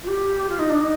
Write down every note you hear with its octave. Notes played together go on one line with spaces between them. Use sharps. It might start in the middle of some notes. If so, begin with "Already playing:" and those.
F4
G4
F4
D#4
D4
D#4